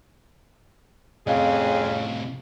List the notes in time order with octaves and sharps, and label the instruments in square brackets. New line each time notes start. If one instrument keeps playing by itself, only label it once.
[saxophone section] F2 C#4 G#4 [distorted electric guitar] A2 C3 [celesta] D#5 F5